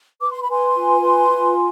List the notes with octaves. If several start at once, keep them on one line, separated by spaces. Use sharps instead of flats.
B4 D6
C6
B5
B4 G#5 C6
F4
B4
F4